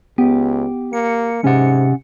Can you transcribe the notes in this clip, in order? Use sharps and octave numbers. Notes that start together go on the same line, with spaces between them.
C#2 B3 G4
A#3 C#7
G#2 C3 C#4 F#5